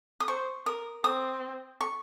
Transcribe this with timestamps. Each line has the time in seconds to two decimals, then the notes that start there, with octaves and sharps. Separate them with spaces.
0.20 D#6
0.28 C5 C#6
0.66 A#4 D#6
1.04 C4 D#6
1.81 C#6